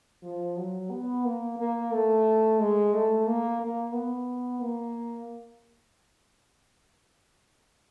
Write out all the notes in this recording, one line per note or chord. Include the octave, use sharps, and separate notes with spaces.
F3
F#3
B3
A#3
A#3
A3
G#3
A3
A#3
A#3
B3
A#3